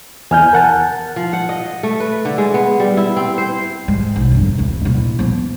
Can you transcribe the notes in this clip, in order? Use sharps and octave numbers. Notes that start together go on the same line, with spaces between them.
E2 G#5 F6 G6
A#4 F#5 A5
F3
F#5
D#5
A3
B4
D3
G#3
B3
G3
E4
C4
C5
G#2
B1
G1 F2
D1 E3
A#2 E4
F3 B3